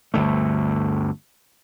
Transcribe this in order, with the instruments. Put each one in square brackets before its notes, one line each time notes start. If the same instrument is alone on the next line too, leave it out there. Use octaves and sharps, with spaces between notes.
[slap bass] G1 D2 A3